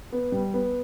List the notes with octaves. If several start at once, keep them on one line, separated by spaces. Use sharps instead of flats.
B3
G3
B3